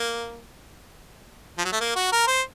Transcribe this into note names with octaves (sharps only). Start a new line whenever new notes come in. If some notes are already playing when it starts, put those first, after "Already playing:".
Already playing: A#3
F3
F#3
A3
A#3
F#4
A#4
C5